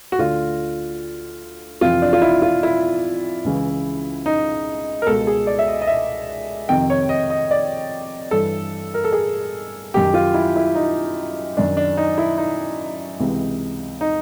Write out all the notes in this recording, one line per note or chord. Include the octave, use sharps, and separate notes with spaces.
F#4
D2 D3 F4
F2 C3 E3 F4
D4
F4
E4
F4
E4
C#2 C#3 E3
D#4
A#4
C#2 B2 A4
G#4
D5
E5
D#5
D#5
E5
F2 C3 D#3 G5
C#5
D#5
D#5
D5
G2 E3 A4
A#4
A4
G#4
F#2 D#3 G4
F4
E4
E4
D#4
F#2 D#3 D4
D4
D#4
E4
D#4
C#2 C3 E3
D#4